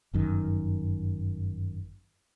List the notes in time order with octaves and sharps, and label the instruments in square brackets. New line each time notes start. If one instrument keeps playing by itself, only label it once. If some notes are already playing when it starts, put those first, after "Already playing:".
[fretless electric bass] G1 F#2 D#3